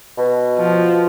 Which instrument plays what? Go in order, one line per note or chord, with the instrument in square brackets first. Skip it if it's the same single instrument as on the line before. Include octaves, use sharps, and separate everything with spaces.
[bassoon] B2
[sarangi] F3